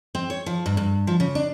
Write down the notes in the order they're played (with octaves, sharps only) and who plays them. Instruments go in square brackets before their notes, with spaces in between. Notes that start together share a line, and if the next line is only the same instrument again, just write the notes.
[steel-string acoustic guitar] C4
C#5
F3
G2
G2
F3
C#3
D4